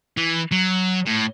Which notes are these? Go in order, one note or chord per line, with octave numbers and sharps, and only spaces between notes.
E3
F#3
A2